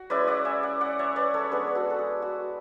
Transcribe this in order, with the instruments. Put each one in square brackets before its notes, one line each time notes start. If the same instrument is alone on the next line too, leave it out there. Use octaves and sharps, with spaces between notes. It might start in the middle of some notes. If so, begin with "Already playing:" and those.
Already playing: [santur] F#4
G#3 C#4 E4 B4 D5
D5 F#5
E5 G#5
D5 F#5
D5 F#5
C#5 E5
B4 D5
A4 C#5
G#3 B3 D4 G#4 B4
B4
F#4 A4
A4
G#4
F#4